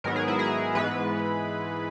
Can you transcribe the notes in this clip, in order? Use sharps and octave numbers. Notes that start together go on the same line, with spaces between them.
G#2 D#3 F#3 B3 A#4
G#4
E4
G#4
G#2 E3 G#3 B3 B4